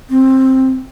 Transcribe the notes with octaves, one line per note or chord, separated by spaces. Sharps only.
C4